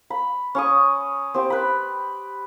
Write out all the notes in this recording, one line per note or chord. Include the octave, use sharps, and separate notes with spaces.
B5
C#4 C#6 D#6
C4 G4
B4 B5